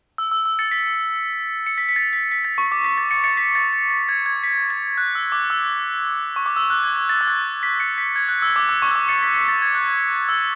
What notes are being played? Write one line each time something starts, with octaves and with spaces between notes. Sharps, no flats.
E6
E6
E6
A6 C#7
B6
C#7
B6
B6
A6
B6
B6
A6
C#6
D6
B6
A6
A6 C#7
A6 C#7
B6
A6
A6
A6
G#6
G#6
B6
A6
F#6
E6
D6
E6
C#6
D6
E6
F#6
G#6
G#6
A6
E6
F#6
B6
A6 C#7
B6
G#6
F#6
E6
D6
E6
C#6
E6
D6
A6 C#7
B6
B6
A6
G#6
F#6
E6